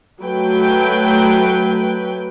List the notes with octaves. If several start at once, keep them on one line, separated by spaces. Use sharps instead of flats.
F#3 A3 B4 G5